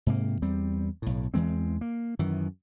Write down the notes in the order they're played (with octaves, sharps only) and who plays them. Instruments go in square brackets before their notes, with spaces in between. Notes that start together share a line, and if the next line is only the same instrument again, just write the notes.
[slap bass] G#2 C3 A#3
E2 G3 C4
B1 A2
E2 E3 G#3 C4
A#3
F#2 D#3 E3